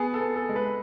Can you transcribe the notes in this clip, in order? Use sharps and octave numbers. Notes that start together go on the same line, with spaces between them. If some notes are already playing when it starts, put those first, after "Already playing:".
Already playing: B3 G#4
A4
B3
A4
G#3
B4